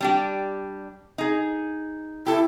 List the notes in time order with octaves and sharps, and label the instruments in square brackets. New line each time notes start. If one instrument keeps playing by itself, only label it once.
[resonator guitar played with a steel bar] G3 D4 G4
D#4 G#4
[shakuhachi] E4 [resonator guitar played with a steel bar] G4 A4